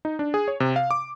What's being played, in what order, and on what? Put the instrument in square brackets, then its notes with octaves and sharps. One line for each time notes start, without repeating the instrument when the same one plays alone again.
[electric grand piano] D#4
D4
G#4
C#5
C3
F5
D6